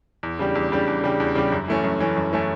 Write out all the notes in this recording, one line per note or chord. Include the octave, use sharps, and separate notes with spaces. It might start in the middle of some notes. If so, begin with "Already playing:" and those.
E2
C#3 G3 D4 G4
E2
C#3 G3 D4 G4
E2
C#3 G3 D4 G4
E2
C#3 G3 D4 G4
F#2
E3 A3 C#4
F#2
E3 A3 C#4
F#2
E3 A3 C#4